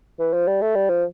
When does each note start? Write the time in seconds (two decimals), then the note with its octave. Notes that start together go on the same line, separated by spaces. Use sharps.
0.19 E3
0.33 F3
0.48 G3
0.62 A3
0.75 G3
0.90 F3